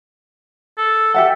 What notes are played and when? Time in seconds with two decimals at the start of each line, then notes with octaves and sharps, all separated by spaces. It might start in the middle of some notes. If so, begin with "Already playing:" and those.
0.78 A4
1.14 G4 A4 E5 F#5